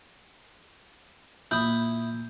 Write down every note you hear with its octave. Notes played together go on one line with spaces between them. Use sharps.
A#2 E4 D#6 G6